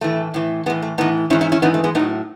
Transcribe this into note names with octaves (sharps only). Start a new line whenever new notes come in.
A2 E3 A3
A2 E3
A2 E3 G#3 B3
A3
A2 E3 B3 D#4
G#2 E3 C#4 E4
C#4 E4
C#4 E4
G#2 E3 B3 D#4
A3
G#3 B3
A2 F#3 B3 D#4